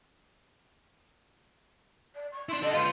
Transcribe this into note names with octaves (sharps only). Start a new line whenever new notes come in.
D5
C#6
D4 E4 C6
D4 A4 D#5
F4 B4 C6